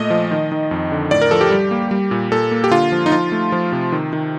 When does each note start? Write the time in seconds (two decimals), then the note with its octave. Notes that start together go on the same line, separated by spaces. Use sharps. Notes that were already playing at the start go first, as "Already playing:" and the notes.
Already playing: A#2 A3 D#5
0.10 F3
0.31 D#3
0.52 D#3
0.71 F2
0.92 D3
1.11 A2 D5
1.21 A#4
1.31 F3 A4
1.41 G4
1.51 G3
1.71 A#3
1.91 G3
2.11 A#2
2.32 A#2 A4
2.51 A#3
2.64 G4
2.71 D3 F4
2.92 F3
3.06 D#4
3.12 F3 F4
3.32 A3
3.52 F3
3.72 C3
3.92 D#3
4.13 D#3